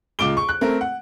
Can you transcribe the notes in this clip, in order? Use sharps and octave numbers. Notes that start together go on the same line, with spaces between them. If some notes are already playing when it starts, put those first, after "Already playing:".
C#2 F4 D6 D7 G7
C#6
F#6
A3 C4 A#4
F#5